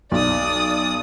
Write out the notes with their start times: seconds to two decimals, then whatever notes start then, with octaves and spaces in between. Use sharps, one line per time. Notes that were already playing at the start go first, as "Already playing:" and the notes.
0.11 B1 D5 D#6